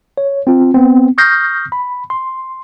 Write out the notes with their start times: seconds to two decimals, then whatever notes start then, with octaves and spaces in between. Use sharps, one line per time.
0.18 C#5
0.47 C4 F4
0.74 B3 C4
1.18 C#6 D#6 F6 G6 A#6 C7
1.72 B5
2.10 C6